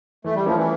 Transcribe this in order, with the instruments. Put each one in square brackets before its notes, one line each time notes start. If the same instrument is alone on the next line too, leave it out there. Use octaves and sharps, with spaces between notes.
[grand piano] E3 [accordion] A3
[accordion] G3
[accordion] F3 [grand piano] A3 C#4 E4 A#4
[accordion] E3